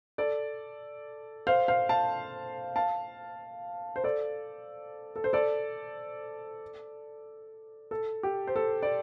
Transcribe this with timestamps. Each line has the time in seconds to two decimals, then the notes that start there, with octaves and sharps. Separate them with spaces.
0.18 A4 D5
1.47 C5 F5
1.68 C5 F5
1.89 F5 A5
2.76 F5 A5
3.96 C5
4.04 A4 D5
5.16 A4
5.24 C5
5.33 A4 D5
7.91 A4
8.23 G4
8.47 C5
8.56 A4
8.82 D5